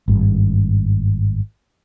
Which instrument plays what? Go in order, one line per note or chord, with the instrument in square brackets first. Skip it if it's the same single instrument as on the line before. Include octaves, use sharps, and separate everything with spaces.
[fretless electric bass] G#1 G2